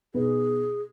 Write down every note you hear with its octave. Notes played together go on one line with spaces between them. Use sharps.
B2 B3 D#4 G#4 B4